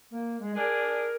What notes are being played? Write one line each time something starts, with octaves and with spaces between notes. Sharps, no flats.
A#3
G#3
D4 G#4 A#4